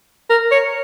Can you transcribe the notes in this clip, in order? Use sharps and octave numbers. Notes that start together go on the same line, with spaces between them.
A#4
C#5